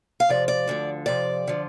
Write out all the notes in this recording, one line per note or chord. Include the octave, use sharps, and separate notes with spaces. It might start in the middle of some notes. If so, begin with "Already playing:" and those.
F5
F2 C3 F3 D5
D5
D2 D3 F3
F2 C3 F3 D5
D3 F3